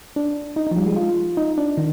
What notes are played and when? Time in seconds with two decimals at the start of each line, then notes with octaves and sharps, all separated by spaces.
0.16 D4
0.56 D#4
0.67 D#4
0.71 F3
0.77 G3
0.86 G#3
0.96 F4
1.37 D#4
1.58 D4
1.77 D#3